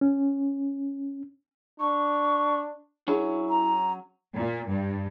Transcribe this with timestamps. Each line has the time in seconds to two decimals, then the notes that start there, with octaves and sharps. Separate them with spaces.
0.01 C#4
1.80 D4 C#6
3.08 F#3 C#4 D4 E4 G#4
3.49 A#5
4.37 A#2
4.69 G2